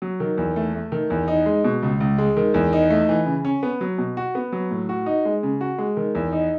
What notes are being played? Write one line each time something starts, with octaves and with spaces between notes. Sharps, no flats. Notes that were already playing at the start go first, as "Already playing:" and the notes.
F#3
D#3
E2
A3
A3
D#3
E2
D#4
G#3
B2
C#2
C#2
G#3
D#3
E2
D#4
A3
E3
C#3
C#4
B3
F#3
B2
F#4
B3
F#3
A2
F#4
D#4
G#3
C#3
F#4
G#3
D#3
E2
D#4